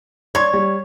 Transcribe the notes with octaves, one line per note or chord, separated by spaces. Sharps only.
C#5 D5 C6 G#6
G3